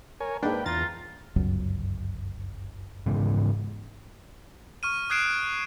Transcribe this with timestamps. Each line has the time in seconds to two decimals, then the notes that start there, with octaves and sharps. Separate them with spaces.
0.20 A#4 C#5 G#5
0.43 G#2 A#3 D4 B4 G5
0.66 E2 F4 A#5 A6
1.36 G1 C#2 F#2
3.06 G#2 C#3 E3
4.83 C#6 F6 D#7
5.10 D#6 F#6 G#6 C7 D7 E7